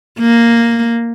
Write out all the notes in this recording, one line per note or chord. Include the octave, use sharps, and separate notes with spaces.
A#3